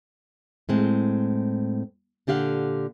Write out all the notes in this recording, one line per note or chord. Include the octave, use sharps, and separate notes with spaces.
A2 G#3 C4
A#2 D3 G4 F5 F#5